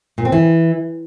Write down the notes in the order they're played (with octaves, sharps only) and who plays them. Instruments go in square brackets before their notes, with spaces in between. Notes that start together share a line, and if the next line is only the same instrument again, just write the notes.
[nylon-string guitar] A#2
C4
E3